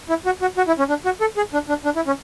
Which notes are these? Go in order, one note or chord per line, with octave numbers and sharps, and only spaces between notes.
E4
F#4
F#4
F#4
E4
C#4
D4
F#4
A4
G#4
D4
D4
D4
E4
C#4